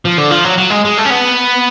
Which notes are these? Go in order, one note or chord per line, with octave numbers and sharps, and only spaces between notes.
F3
D3
F3
F#3
F#3
G#3
G#3
A3
C#4
B3